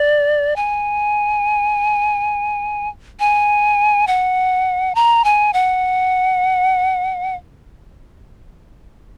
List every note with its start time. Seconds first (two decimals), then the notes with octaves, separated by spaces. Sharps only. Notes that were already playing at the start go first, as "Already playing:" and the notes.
Already playing: D5
0.56 G#5
3.20 G#5
4.07 F#5
4.95 A#5
5.24 G#5
5.53 F#5